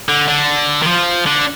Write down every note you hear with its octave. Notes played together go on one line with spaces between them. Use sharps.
D3
D3
D#3
F3
D3